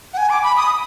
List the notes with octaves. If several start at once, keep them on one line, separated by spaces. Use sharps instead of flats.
F#5
G#5
D6
B5
D#6